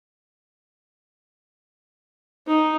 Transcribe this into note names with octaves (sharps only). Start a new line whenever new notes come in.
D#4